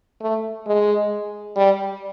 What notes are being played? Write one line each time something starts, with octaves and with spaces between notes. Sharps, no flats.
A3
G#3
G3